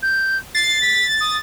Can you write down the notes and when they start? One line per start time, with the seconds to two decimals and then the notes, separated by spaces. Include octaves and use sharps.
0.02 G6
0.55 A6 C7
0.82 B6
1.21 D#6